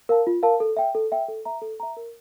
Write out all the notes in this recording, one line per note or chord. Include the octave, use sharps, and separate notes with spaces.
A#4 F5 A5
F4
A#4 F5 A5
A4
E5 G5
A4
E5 G5
A4
E5 A#5
A4
E5 A#5
A#4